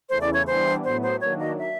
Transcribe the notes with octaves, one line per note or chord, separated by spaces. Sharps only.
E2 C#3 E3 A3 C5
D5
C#5
E3 G3 B3 D4 C5
A2 F#3 B3 C5
C5
D#3 F#3 A#3 D4 C#5
D#5
E5